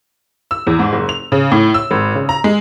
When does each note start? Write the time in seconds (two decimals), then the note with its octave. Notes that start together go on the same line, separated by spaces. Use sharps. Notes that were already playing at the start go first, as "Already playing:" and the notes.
0.51 E6
0.67 E2
0.79 G#2
0.93 F#1
1.09 F7
1.32 C#3
1.51 A2
1.74 E6
1.91 G#1
2.15 C#3
2.29 A#5
2.44 G#3